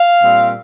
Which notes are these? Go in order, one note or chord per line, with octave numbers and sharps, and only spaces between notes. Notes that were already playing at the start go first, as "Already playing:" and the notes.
Already playing: F5
A#2 G3 C4